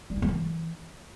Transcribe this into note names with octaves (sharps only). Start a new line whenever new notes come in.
G3
E4
F#3
E3